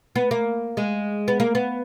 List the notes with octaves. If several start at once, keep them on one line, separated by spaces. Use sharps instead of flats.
B3
A#3
G#3
B3
A#3
B3